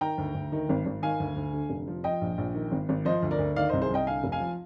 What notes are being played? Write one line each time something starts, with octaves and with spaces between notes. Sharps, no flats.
D#3 G5 A#5
D2
D2
D#3
G#1
G#1
D#3 F5 G#5
D2
D2
D3
F1
F3
F3 D#5 G5
A#1
A#1
D#3
G#1
G#1
F3 C5 D#5
D2
A#4 D5
D2
D#3 D5 F5
C5 D#5
C2
G#4 C5
C2 D#5 G5
D3 F5 G#5
F1
F5 G#5
F3